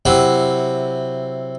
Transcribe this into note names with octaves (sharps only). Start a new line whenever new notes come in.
C3 F#3 E4